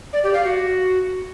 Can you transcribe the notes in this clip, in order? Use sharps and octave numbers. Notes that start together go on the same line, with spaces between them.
D5
G4
F5
F#4